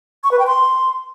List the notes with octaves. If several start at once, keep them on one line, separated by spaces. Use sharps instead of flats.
C#6
B4
G5
C6